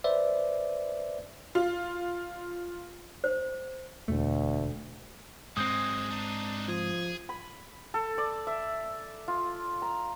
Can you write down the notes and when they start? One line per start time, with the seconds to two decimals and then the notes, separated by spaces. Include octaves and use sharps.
0.04 B4 C5 D5 E5
1.55 F4
3.24 C5
4.08 E1 D2 A3
5.57 G#2 F#3 G#3 C4 D#6 G6
6.11 D4 D#4
6.68 F3 G#4
7.29 B5
7.94 A4
8.18 D5
8.47 E5
9.28 F4
9.82 A#5